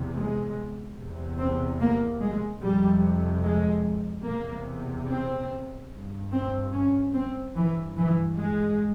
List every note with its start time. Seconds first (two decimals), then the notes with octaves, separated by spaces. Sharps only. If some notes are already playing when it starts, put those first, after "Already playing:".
Already playing: E2 C3
0.15 G#3
0.98 E2 C3
1.38 C4
1.80 A#3
2.21 G#3
2.62 F2 C3 G3
3.45 G#3
4.26 E2 C3 A#3
5.08 C4
5.91 G2
6.32 C4
6.73 C#4
7.13 C4
7.55 G2 E3
7.97 E3
8.37 G#3